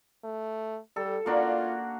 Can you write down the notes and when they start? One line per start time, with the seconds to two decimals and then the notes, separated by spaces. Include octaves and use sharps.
0.24 A3
0.96 G3 A4
1.26 A#3 D4 F4 F#4